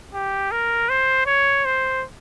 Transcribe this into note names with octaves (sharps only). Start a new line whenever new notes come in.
G4
A#4
C5
C#5
C5